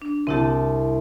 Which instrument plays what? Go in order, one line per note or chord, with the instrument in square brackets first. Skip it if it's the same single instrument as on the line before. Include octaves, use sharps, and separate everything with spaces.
[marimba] D4
[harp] C2 A5 [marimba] C4 E4 G4